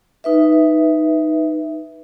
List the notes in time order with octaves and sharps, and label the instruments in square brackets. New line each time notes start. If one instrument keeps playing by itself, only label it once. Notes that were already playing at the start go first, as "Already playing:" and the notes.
[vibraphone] D#4 B4 E5